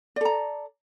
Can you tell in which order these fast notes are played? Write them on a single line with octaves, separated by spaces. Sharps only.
D5 A4 A#5